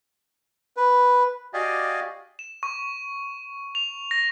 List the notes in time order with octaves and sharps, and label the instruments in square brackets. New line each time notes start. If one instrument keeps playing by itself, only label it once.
[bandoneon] B4
[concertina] F#4 G4 D5 D#5 F5 G#5
[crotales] E7
C#6
F7
A#6